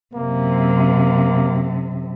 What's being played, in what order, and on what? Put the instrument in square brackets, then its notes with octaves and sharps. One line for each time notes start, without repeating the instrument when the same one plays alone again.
[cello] F#2 C3 [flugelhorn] A#3